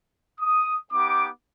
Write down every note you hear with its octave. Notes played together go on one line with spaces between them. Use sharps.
D#6
B3 D#4 G4 D6